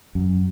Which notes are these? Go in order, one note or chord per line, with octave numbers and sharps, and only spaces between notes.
F#2